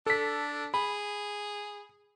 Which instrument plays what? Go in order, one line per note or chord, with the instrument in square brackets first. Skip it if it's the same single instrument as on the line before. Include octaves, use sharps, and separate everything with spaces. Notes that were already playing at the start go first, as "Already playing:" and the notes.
[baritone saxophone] D4 [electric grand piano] A4 B6
[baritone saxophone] G#4 [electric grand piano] B5